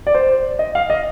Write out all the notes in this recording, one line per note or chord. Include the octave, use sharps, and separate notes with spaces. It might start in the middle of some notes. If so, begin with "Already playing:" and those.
D5
C5
D#5
F5
D#5